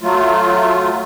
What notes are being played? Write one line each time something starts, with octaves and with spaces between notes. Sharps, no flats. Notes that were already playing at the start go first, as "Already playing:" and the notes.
F#3 A3 F4